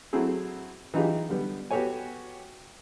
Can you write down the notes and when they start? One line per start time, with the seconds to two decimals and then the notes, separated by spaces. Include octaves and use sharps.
0.13 F#3 A3 C4 E4 G#4
0.94 E3 D#4 F4 G4 G#4
1.29 D3 G3 B3
1.71 B3 F#4 G4 A4 C#5 G#5